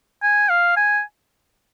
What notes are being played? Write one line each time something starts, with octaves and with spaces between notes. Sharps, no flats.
G#5
F5
G#5